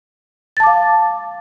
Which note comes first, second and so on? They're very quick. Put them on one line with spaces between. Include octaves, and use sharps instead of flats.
A6 A5 D6 F5